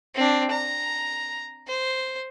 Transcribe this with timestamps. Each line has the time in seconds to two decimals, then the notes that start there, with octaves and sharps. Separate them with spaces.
0.15 C4 D4
0.50 A#5
1.67 C5